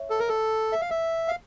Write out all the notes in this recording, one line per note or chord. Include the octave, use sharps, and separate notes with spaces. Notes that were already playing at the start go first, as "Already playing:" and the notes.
Already playing: C#5 E5
A4
A#4
A4
E5
F5
E5
F5